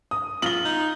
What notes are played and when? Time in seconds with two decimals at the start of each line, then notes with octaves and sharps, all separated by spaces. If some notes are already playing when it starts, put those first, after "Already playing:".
0.11 D#6
0.42 F4 F#7 G7
0.65 D#4